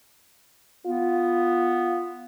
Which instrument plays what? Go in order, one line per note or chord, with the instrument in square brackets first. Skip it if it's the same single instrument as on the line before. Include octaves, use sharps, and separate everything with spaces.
[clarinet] B3 [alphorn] F4